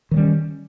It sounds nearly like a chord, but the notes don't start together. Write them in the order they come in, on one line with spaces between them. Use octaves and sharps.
D#3 F#3 G3 C#4